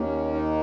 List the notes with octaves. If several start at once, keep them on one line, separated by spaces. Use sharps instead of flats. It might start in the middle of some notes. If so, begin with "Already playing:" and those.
Already playing: D#2 D#3 A#3 C#4
D#4